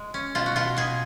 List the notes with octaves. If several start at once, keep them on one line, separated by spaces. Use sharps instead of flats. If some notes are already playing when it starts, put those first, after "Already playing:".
Already playing: G#3
C#4
B2 F4
F#4
B2 F4
B2 G#4